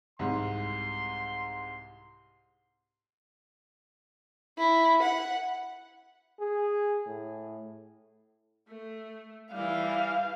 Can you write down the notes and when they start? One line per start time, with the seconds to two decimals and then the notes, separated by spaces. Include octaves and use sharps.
0.19 C2 G#2 C6
4.58 E4
5.02 F#5
6.39 G#4
7.07 A2
8.68 A3
9.52 E3 G3 F5